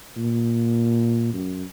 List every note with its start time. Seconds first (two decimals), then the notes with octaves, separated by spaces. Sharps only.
0.17 A#2
1.33 F#2